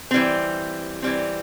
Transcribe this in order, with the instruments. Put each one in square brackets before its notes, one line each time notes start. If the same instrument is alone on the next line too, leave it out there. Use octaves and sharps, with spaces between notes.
[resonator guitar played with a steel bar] E3 G3 C4
E3 G3 C4